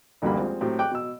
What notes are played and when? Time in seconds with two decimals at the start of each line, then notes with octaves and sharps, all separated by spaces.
0.22 A1 D2 G2 G3 A#3 B5
0.38 F3 G3 G#3 C4
0.61 A2 F#3 C4 G4
0.79 G5 D6 F#6
0.91 B2 E6